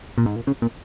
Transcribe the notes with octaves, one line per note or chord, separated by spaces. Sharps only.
A#2
G#2
A#2
C#3
A#2